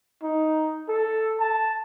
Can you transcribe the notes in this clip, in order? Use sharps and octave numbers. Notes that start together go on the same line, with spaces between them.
D#4
A4
A5